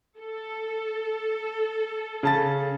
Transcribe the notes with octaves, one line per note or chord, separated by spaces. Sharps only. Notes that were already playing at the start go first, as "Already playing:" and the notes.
A4
C#3 A5 A6